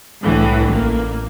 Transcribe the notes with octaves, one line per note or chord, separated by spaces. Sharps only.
C2 A2 D3 E3
A1 A#3